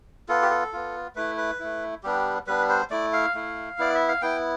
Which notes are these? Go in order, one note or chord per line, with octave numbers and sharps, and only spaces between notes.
B3 F4 A4
G4
A4
B3 F4
A3 E4 B4
B4
A3 E4
G3 B3 D4 G4
G3 B3 D4 B4
C5
A3 E4 D5
F5
A3 E4
B3 E4 D5
E5
F5
B3 E4 G5